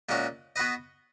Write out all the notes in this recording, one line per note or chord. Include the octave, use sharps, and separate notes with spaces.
A#2 G#3 C#4 F#4
B3 F#4 B4 D#5